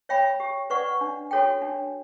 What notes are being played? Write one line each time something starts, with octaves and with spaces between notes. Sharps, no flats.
C#5 E5 G5 B5
G4
B4 D5 F#5 C#6
D4
F#4 A4 C#5 G5
D4